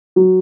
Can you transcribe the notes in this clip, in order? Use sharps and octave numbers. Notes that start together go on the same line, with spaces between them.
F#3